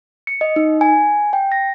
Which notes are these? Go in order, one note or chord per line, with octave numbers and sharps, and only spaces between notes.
C#7
D#5
D#4
G#5
G5
A#6